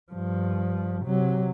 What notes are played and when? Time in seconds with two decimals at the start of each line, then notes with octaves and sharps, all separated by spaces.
0.12 G2 F3
1.05 C3 F#3